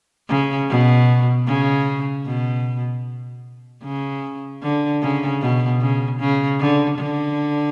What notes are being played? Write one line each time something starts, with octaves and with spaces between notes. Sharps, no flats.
C#3
B2
C#3
B2
C#3
D3
C#3
B2
C#3
C#3
D3
D3